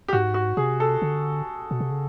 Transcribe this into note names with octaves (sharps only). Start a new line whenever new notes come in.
G4
G#2 F#4
F#4
C3 G#4
A4
D3
B2
C3
C#3